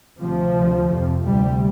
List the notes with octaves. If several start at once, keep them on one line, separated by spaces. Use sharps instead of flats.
D2 C3 F3
D2 C3
F2 C3
D2 C3 G3